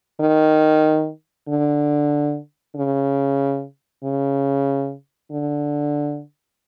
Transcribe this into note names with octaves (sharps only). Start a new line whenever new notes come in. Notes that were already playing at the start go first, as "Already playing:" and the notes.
D#3
D3
C#3
C#3
D3